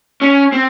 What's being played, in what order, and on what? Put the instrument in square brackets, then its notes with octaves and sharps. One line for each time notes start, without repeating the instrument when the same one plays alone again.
[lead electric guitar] C#4
C4